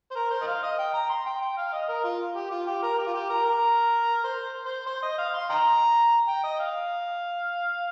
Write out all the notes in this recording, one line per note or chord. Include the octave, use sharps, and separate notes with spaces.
C5
A#4
C5
D#5
F5
D#5
G5
A#5
C6
G5
G5
F5
D#5
A#4
F4
G4
F4
G4
A#4
G4
F4
G4
A#4
A#4
C5
C5
C5
D#5
F5
C6
D#5 G5 A#5
G5
D#5
F5